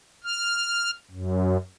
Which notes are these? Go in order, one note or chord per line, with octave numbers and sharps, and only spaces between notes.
F6
F#2